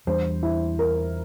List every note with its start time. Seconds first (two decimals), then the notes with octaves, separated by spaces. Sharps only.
0.07 E2 E3 G3 D4 C5
0.43 E4
0.79 A#4